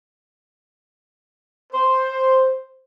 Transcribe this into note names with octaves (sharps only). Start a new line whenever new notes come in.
C5